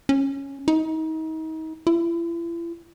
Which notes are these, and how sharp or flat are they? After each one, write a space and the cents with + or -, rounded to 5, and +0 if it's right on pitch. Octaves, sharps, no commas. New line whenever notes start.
C#4 -5
D#4 +35
E4 +40